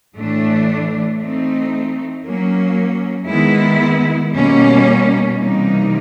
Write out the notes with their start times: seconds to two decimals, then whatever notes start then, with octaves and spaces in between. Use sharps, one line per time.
0.15 A2 E3 A3 D4
1.19 E3 A3 C4 D#4
2.24 F#3 A#3 C#4
3.28 D#3 G#3 B3 E4
4.32 B2 G3 A#3 C#4
5.36 C3 E3 G3 A#3 D#4